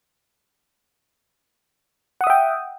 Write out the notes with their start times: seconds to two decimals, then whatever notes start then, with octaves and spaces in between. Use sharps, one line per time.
2.21 F#5
2.24 D#6
2.27 E5
2.30 G5